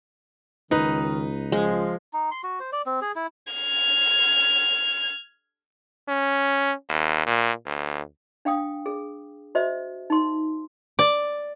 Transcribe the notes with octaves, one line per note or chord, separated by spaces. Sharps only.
C#2 D#3 D#4 B4
F3 G#3
D#4
C6
F#4
C5
D5
C4
G#4
E4
F6 G#6
C#4
D#2
A#2
D2
D4 F5 G5 D#6
G#4
F#4 C5 D#5 E5
D#4 C6
D5